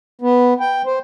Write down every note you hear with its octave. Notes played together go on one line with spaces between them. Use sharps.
B3
G5
C5